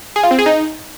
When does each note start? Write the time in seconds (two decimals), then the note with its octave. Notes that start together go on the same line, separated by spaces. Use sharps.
0.16 G#4
0.23 F4
0.31 C4
0.38 G#4
0.46 D#4